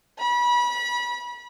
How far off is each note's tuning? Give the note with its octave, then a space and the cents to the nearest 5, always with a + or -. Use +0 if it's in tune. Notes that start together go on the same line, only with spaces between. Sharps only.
B5 -30